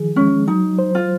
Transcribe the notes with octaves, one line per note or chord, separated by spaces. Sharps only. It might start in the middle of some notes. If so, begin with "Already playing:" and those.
Already playing: D#3 F3 G#4
G#3 C#4
F#3 D#4
C5
F4